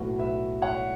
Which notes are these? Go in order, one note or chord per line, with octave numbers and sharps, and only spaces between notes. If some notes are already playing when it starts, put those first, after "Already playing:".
Already playing: B1 A2 A3 F#4 B4
B4 E5
C#5 F#5